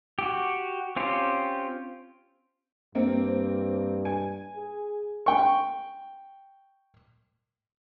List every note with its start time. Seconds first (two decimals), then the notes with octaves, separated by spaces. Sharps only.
0.19 F#4 G4
0.96 C4 C#4 F4 G4
2.95 G2 A#3 C4
4.05 G#5
4.56 G#4
5.26 G5 C#6